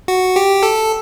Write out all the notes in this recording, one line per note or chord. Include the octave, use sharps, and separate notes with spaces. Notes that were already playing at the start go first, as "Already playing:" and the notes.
F#4
G4
A4